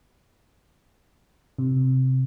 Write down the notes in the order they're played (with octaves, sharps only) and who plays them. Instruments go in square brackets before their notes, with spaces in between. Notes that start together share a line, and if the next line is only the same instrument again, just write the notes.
[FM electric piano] C3